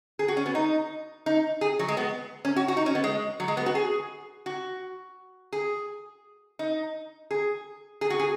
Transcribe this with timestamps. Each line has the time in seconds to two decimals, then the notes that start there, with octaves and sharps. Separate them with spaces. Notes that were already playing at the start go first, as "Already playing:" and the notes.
0.19 G#4
0.28 F#4
0.37 C#4
0.46 B3
0.55 D#4
1.26 D#4
1.61 G#4
1.79 F#3
1.88 G#3
1.97 B3
2.45 C#4
2.56 F#4
2.68 F#4
2.77 D#4
2.86 C#4
2.95 B3
3.04 G#3
3.40 F#3
3.48 G#3
3.57 B3
3.66 F#4
3.75 G#4
4.46 F#4
5.53 G#4
6.59 D#4
7.31 G#4
8.01 G#4
8.10 F#4
8.20 G#4